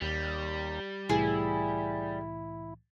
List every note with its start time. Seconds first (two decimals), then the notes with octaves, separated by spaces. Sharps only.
0.02 D#2 G3
1.09 C2 A2 E3 E4 G#4